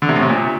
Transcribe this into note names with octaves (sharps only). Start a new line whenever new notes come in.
D3
C3
A2
C3
A#2